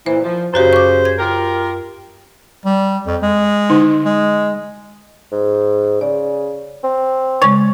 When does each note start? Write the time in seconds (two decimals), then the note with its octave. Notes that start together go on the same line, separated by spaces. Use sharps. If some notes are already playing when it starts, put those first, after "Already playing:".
0.06 A#2 E3 C5
0.23 F3
0.54 F#2 C#3 F#4 G4 C5
0.73 C#6 D6
1.05 G#6
1.19 F4 G4 A#4
2.65 G3
3.06 F2
3.22 G#3
3.70 D3 D#4
4.05 G#3
5.32 G#2
6.01 C#3 D5
6.84 C4
7.42 C#3 G#3 C#5 D5